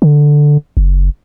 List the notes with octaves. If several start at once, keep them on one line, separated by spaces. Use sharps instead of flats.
D3
F#1